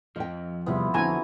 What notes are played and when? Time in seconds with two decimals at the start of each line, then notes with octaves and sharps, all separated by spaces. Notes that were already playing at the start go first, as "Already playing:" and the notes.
0.16 F2 F3 D#5 G5
0.66 E2 C3 G3 B3 E4 F4
0.94 D3 C4 E4 F#4 G#5 A#5